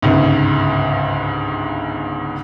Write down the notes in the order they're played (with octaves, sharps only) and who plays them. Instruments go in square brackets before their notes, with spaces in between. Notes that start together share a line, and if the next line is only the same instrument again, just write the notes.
[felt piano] G1 C#2 G#2